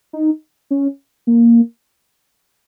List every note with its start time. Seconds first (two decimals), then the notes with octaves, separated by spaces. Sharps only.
0.13 D#4
0.71 C#4
1.27 A#3